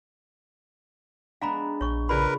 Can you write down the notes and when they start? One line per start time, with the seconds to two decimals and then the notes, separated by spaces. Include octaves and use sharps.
1.42 G#3 B3 D4 F5 A#5 B5
1.81 A#1 C#5 C#6
2.09 C#3 F4 G#4 A#4 B4 D5 B5